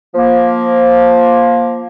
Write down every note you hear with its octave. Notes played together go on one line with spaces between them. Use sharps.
F3 A#3